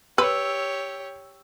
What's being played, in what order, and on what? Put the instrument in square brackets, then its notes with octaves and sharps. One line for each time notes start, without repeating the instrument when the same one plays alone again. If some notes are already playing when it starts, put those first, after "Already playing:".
[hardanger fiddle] G4 C#5 [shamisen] B4 [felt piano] E6